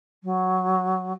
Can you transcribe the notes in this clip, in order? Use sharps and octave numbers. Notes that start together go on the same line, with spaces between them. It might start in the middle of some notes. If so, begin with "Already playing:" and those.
F#3